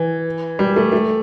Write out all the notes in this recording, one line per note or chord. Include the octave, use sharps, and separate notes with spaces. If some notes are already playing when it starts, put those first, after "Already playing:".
Already playing: E3
G3
A3
A3